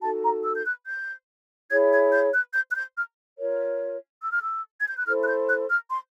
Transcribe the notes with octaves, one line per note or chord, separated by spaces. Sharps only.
D#4 F#4 A4 A5
A#5
E6
G6
F#6
G6
E4 G#4 C#5 G#6
G#6
G6
F#6
G6
F#6
G6
F6
F4 A#4 C#5
E6
F6
E6
G#6
G6
F#6
E4 A4 C5 F6
F#6
G6
F#6
F6
C6